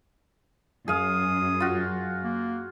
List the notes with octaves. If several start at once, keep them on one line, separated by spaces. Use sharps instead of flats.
F#2 G#4 F5 D#6
F4 F#4
A#3